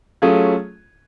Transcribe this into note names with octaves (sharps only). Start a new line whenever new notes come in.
F#3 A3 C#4 F4 G#4